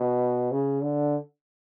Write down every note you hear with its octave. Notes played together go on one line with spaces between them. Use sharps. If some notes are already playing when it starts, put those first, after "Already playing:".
Already playing: B2
C#3
D3